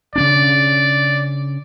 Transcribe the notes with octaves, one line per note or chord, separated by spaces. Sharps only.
C#3 C#4 D4 D5